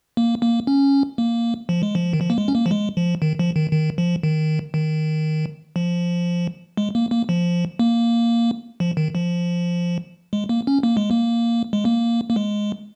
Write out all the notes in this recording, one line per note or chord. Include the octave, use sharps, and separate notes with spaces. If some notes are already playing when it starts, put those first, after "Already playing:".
A#3
A#3
C#4
A#3
F3
G#3
F3
D#3
F3
A#3
G#3
C#4
A#3
F3
G#3
F3
D#3
F3
D#3
D#3
F3
D#3
D#3
F3
G#3
A#3
A#3
F3
A#3
F3
D#3
F3
G#3
A#3
C#4
A#3
G#3
A#3
G#3
A#3
A#3
G#3